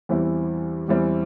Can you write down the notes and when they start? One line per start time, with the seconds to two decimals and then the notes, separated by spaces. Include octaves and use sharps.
0.09 E2 E3 G3 C4 E4
0.88 E2 E3 G3 C4 E4